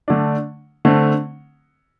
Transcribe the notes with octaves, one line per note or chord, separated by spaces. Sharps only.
D3 A3 D4
D3 A3 C4